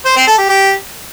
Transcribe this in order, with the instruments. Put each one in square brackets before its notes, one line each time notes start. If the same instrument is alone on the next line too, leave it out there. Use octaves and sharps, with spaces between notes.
[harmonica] C5
C4
A4
G4
G4